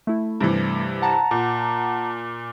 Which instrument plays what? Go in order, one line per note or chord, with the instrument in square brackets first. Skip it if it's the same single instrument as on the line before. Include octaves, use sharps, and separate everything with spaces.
[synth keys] A3 E4
[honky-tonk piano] G2 C3 E3
[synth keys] F#5 A5 A#5
[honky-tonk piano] A#2